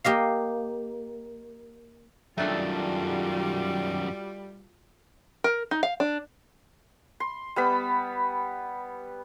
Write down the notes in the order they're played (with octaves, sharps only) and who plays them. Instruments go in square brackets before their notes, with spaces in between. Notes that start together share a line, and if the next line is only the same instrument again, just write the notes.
[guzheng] A#3 G4 D#5 F5
[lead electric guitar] F#2 D#3 [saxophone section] G3 [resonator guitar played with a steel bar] A3 D4 A4 [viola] F4 F#4
[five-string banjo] A#4
D#4
F5
D4
[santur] C6
G3 B3 B5